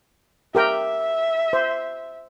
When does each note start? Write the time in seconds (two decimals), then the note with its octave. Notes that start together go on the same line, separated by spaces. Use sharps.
0.55 G4 A#4 E5 G5
1.53 C5